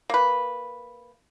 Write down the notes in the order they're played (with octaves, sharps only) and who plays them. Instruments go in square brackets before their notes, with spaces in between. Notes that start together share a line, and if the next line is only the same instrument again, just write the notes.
[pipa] A#3 B4